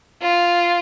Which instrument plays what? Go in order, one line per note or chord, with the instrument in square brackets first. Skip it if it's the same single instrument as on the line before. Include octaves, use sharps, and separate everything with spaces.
[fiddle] F4